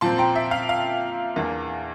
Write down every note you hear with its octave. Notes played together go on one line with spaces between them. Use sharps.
A#2 F3 C4 A5 C6
G5 A#5
E5
F5
F5
E2 E3 A#3 D4